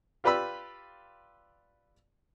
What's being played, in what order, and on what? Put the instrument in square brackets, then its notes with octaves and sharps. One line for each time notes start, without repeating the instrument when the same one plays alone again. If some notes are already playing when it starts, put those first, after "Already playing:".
[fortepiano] F4 G4 B4 D5 B5 E6